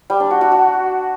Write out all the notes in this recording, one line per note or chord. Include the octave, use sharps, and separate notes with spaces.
G3
D4
F#4
F#4
F#4